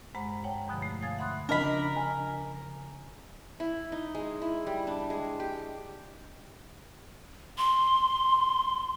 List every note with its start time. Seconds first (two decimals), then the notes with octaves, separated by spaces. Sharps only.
0.15 G2 G#3 C5 F#5 A#5
0.44 C#5 F#5 G5 A5 A#5
0.68 E2 G2 B2 D3 F3
0.82 A3
1.02 F5 G#5 D#6 G#6 A6
1.18 E5 F#5 B5 C6 D#6 F#6
1.49 C#3 F3 D4 A#4 D#5 B5
1.97 G#5
3.60 E4
3.92 D#4
4.15 G#3
4.42 E4
4.67 G3
4.87 D4
5.10 G#3
5.40 G4
7.58 C6